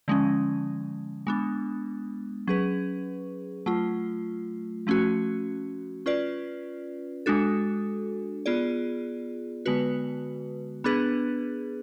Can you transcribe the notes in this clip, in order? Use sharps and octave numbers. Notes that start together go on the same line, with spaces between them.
D3 F3 G#3 C#4
G#3 B3 D4
F#3 C#4 G#4 B4
F#3 A3 F4
F3 A3 C#4 F#4
C#4 F4 B4 D5
G#3 D4 F#4 A4
B3 F4 G#4 D5
D3 G#3 B3 F#4 B4
B3 D4 G#4 B4